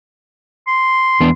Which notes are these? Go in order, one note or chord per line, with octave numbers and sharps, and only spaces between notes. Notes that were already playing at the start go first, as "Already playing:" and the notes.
C6
E2 B3 D4